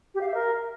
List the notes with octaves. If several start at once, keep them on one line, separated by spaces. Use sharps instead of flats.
G4
F5
E5
A#4